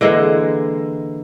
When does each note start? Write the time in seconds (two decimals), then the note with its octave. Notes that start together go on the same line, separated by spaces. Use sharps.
0.01 D3 E3 G#3 A#3